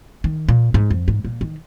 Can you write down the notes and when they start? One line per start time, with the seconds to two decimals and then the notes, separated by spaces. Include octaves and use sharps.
0.24 D#3
0.49 A#2
0.74 G#2
0.91 F2
1.08 G#2
1.25 A#2
1.41 D#3